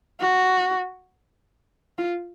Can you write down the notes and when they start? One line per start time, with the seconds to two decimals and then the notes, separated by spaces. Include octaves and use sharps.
0.21 F#4
1.98 F4